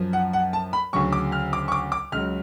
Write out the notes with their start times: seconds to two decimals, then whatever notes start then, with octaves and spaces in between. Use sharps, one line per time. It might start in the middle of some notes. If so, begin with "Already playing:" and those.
Already playing: F#2 F3
0.13 F#5
0.33 F#5
0.53 A5
0.73 B5
0.93 D2 C#3 F#3 C#6
1.13 D6
1.32 F6
1.53 D6
1.68 C#6
1.72 D6
1.92 D6
2.12 C#2 C#3 F#3 F6